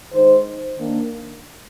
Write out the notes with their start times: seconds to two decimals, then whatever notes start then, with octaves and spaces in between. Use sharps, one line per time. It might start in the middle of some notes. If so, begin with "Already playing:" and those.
0.13 D#3 G#3 D#4 C5
0.76 D#3 A#3 D4